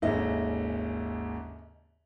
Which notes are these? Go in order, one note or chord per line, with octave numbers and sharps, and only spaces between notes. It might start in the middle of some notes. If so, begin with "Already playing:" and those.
G#1 D#2 C#3 A4 D#5 E5